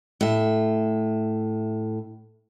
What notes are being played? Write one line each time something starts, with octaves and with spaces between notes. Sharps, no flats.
A2 E5